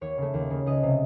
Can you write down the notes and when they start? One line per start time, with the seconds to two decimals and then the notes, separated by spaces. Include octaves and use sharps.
0.01 D#2 C#5
0.18 C#3 A3
0.34 D#2
0.50 C#3 A3
0.66 C#2 D#5
0.83 C3 F#3